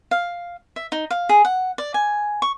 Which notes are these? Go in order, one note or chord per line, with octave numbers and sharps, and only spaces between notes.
F5
E5
D#4
F5
G#4
F#5
D5
G#5
C#6